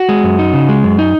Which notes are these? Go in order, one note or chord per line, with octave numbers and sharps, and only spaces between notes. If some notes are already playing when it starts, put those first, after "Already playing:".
Already playing: F#4
G#3
F#2
D#4
C#3
G#3
F#2
D#4